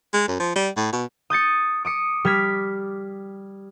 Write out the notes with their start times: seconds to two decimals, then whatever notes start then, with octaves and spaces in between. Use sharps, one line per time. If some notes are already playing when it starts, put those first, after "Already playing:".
0.13 G#3
0.28 F#2
0.40 F3
0.56 G3
0.77 A2
0.93 B2
1.30 D#6 G6 A6 C#7
1.85 D6 D#6 C#7
2.25 G3 F6 G#6 B6